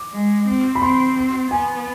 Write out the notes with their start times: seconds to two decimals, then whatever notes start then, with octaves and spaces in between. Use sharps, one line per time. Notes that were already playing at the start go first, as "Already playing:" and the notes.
Already playing: D6
0.13 G#3
0.48 C4
0.75 B5
0.82 C4 C6
1.51 B3 G#5